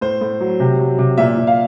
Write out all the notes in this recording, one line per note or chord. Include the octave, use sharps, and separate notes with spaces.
A2 C5
A2
F#3
C3
F#3
C3
A#2 E5
A#2
F5